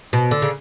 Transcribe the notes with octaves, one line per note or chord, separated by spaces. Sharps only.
B2
D3
C#3